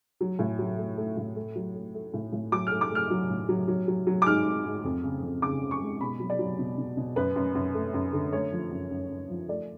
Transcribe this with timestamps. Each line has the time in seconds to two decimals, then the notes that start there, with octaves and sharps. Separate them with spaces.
0.21 F#3
0.39 A2
0.59 F#3
0.78 A3
0.97 A3
1.17 A2
1.36 A3
1.56 F#3
1.75 A3
1.95 A3
2.14 A2
2.32 A2
2.52 F#3 D6
2.67 A3 F6
2.81 D6
2.90 A3 F6
3.10 F#3
3.30 A2
3.49 F#3
3.68 F#3
3.88 F#3
4.07 F#3
4.22 D6
4.26 G#2 F6
4.45 G#2
4.65 G#2
4.84 F2
5.03 C#3
5.23 F2
5.42 C#3 D6
5.61 C#3
5.71 C#6
5.81 G#3
6.01 B2 B5
6.20 F#3
6.30 D5
6.39 F#3
6.59 B2
6.78 B2
6.97 B2
7.16 F#2 B4
7.36 F#2
7.55 F#2
7.74 A3
7.94 F#2
8.13 D3
8.33 A3 C#5
8.52 F3
8.71 F#2
8.91 F#2
9.10 F#2
9.29 F3
9.48 A3 D5